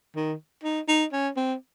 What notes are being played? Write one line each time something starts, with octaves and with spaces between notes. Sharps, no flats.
D#3
D#4
D#4
C#4
C4